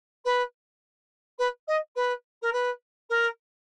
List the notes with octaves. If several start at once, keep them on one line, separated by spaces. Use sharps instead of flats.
B4
B4
D#5
B4
A#4
B4
A#4